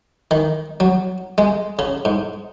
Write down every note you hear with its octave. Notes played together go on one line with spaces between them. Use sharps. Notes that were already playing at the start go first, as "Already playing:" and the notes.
D#3
F#3
G#3
C#3
G#2